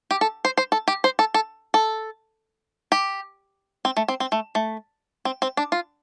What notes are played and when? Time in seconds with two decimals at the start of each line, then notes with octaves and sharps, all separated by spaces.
0.11 G4
0.21 A4
0.45 C5
0.57 C5
0.72 A4
0.88 G4
1.04 C5
1.19 A4
1.34 A4
1.74 A4
2.92 G4
3.85 C4
3.97 A3
4.08 C4
4.20 C4
4.32 A3
4.55 A3
5.25 C4
5.42 C4
5.57 D4
5.72 F4